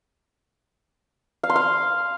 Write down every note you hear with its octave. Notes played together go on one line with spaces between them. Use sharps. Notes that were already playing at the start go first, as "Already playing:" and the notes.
F5
C6
F5